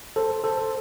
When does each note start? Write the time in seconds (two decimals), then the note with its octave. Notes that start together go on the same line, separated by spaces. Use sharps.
0.16 A4 C5
0.44 A4 C5